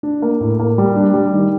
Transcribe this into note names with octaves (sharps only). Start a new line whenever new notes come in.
D4
A#3
A2
A#3
G3
D4
G3
D#3